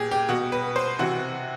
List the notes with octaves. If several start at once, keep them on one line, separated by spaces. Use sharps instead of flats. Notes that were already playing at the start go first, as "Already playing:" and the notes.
Already playing: A#2 G4 G#4
G4
B2 F#4
B4
C5
C3 E3 F#4